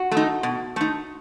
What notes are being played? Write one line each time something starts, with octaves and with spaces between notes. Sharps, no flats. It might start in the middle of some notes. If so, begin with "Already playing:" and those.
Already playing: F#4
A3
D#4
B2
A3 D#4